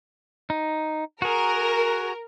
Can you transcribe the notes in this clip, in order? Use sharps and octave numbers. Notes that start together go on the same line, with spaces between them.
D#4
F#4 G#4 A#4